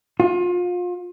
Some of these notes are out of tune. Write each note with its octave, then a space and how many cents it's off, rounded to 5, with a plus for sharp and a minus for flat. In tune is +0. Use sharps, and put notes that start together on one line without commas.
F4 +30